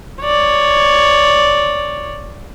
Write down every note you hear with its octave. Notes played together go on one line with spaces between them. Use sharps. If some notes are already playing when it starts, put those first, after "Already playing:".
C#5 D5